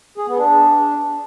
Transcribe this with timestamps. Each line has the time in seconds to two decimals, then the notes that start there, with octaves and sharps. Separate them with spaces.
0.17 G#4
0.28 B3
0.38 D4